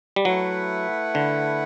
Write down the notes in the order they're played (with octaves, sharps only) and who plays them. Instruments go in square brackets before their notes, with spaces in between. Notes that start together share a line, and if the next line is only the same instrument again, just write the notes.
[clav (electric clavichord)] G3
[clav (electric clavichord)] F#3 [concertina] A3 E4 B4 F#5
[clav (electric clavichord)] D3